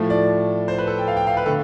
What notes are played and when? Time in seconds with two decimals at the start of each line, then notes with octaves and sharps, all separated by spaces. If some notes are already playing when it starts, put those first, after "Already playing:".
Already playing: A2 F3 A3
0.10 D5
0.68 C5
0.78 B4
0.87 A4
0.98 G5
1.08 F5
1.17 G5
1.27 F5
1.37 B4
1.46 D3 A3 A4